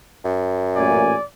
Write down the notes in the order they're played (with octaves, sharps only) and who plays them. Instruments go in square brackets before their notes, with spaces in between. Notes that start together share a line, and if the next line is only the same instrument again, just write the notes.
[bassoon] F#2
[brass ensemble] A1 A#2 G#5 [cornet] D5